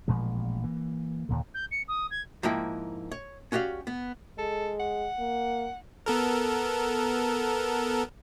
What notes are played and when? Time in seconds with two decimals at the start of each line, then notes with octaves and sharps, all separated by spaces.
0.08 A1 A#2 F3 G#3
0.64 E3 A#3
1.29 D#2 A#2 D3
1.54 G6
1.71 C#7
1.88 D#6
2.10 G#6
2.43 G#2 F3 A#3 E4 G5
3.11 C#5
3.52 C#4 F#4 G4 D5 F5
3.87 B3
4.38 G#3 A4
4.80 F#5
5.19 A#3
6.06 B3 A4 A#4